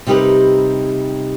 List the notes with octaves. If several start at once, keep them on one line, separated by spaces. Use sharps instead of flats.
C3 G3 D#4 G4 A#4 B4